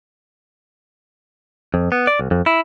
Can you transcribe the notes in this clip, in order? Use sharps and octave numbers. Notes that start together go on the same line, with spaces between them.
F2
B3
D5
C2
F2
E4